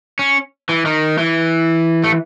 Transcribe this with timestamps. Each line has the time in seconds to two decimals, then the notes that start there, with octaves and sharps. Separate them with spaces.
0.19 C#4
0.69 E3
0.85 D#3
1.18 E3
2.04 A3